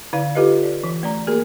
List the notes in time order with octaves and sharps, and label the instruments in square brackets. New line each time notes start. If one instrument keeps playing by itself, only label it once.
[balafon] D3 E4 D5 F5
E4 F4 G4 A4 B4 D#5
D5
E3
A3 D5 A#5
A#3 F#4 G#4 A#4